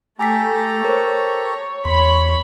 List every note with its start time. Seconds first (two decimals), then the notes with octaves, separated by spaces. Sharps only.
0.19 A3 G4 A4 G#5 A#5 D6 B6
0.85 A#4 C5 C#5
1.85 E2 C#5 B5 C6